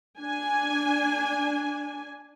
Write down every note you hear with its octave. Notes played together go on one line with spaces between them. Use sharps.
D4 G#5